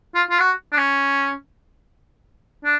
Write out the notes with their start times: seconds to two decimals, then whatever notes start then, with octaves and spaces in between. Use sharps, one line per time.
0.15 F4
0.30 F4
0.40 F#4
0.72 D4
0.77 C#4
2.64 D4